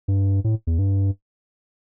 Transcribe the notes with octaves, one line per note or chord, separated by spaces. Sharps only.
G2
A2
E2
G2